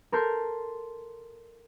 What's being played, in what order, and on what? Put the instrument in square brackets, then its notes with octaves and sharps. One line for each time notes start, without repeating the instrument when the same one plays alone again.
[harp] A4 A#4 C6 G6